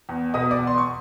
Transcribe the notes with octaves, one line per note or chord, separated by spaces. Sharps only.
E2
B2 D#5 D#6
D5 D6
E2
C6
C#6